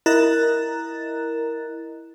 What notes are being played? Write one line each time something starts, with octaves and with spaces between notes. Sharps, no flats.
E4 A#4 D#5 A#5 F#6 A6